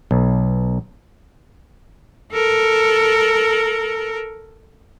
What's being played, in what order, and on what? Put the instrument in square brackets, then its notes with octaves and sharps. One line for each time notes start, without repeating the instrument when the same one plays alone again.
[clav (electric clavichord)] B1
[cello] A4 A#4